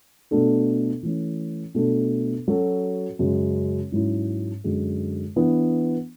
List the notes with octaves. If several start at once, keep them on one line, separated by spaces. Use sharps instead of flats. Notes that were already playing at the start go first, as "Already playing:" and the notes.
B2 A3 D4 A4
E3 A3 C#4
B2 A3 D4 A4
F#3 C#4 F#4 A4
F#2 C#3 G#3
G#2 F#3 C#4 E4
F#2 D3 G#3
E3 B3 D4